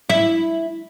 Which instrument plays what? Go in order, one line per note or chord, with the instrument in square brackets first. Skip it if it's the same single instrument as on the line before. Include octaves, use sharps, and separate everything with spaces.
[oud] E4